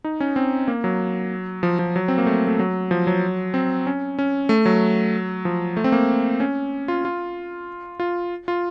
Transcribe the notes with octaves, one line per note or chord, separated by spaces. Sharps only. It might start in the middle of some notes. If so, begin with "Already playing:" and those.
D#4
C#4
C4
A#3
F#3
F3
F3
F#3
C4
A#3
A3
A3
F#3
F3
F#3
C4
C#4
C#4
A3
F#3
F3
A3
C4
A#3
C#4
F4
F4
F4
F4